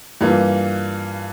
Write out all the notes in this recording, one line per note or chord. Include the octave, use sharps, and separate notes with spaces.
G2 E3 A#3 F4